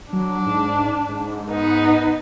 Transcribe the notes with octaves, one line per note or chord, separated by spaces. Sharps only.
F#3 D4
G#2
G#2
B3 D#4